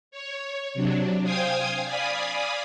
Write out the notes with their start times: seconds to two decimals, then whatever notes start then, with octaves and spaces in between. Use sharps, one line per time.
0.11 C#5
0.74 C3 F#3 D4
1.24 C5 F5 G5 G#5 D#6 G#6
1.85 D5 F5 G#5 B5 D#6